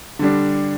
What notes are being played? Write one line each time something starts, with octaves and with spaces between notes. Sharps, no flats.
D3 G3 D4